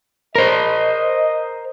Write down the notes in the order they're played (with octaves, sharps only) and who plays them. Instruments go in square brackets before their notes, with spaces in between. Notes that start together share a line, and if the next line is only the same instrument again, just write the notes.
[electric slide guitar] A#4 C5 [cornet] D#5